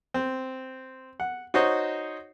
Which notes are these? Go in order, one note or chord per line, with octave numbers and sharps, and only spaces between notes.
C4
F#5
D#4 F#4 C5 C#5 D#5